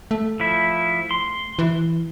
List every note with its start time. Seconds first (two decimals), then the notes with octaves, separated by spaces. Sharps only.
0.11 A3
0.40 F3 E4
1.11 C6
1.59 E3